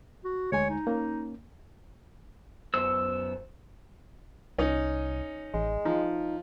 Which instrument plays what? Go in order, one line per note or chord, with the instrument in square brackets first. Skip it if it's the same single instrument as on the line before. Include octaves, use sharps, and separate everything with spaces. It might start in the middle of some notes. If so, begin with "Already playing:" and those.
[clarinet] F#4
[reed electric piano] D2 G#3 G#5 [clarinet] C#5
[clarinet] D#4
[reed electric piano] A#3 C#4
[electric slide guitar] F#2 B3 C5 [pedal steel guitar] E6
[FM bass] C2 [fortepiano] C#4 D#4
[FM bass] A1 [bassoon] G#3
[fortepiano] F3 [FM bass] D#4